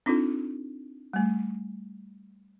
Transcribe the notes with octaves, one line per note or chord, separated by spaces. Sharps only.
C4 D4 D#4 F4 A4
G3 A3